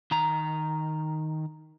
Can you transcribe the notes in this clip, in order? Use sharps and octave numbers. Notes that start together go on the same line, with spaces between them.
D#3 A#5